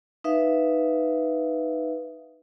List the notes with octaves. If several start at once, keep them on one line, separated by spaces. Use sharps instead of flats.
D#4 B4 E5 F5